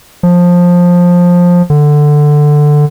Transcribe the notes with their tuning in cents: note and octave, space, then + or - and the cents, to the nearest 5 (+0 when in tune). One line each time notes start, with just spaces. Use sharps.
F3 +15
D3 +10